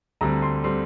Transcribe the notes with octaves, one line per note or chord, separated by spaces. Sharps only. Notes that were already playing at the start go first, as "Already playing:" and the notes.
D2 D3 G3 C4 A#5
C6
D3 G3 C4 C6